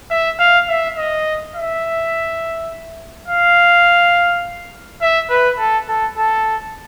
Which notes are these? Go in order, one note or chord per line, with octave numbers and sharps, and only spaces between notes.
E5
F5
E5
D#5
E5
F5
E5
B4
A4
A4
A4